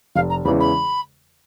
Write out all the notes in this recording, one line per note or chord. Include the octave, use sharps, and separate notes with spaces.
F1 F5
A#5
E2 C#3 E3 G#3 B5
B5